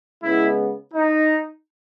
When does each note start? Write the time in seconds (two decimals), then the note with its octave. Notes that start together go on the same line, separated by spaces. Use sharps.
0.22 C#3 G#3 B3 E4
0.93 D#4